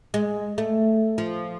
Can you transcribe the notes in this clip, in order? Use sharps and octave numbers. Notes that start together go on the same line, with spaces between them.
G#3
A3
F3